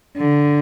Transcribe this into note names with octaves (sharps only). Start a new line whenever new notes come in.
D3